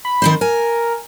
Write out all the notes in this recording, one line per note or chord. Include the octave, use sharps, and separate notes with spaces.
B5
D#3 C4 C5
A#4 G#5